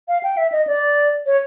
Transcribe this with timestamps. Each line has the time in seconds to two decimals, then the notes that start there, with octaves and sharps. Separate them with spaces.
0.08 F5
0.23 G5
0.37 E5
0.52 D#5
0.67 D5
1.26 C#5